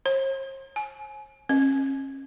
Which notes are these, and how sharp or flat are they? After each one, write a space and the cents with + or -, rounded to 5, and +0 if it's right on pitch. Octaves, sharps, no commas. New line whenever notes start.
C5 +45
G#5 +25
C#4 -35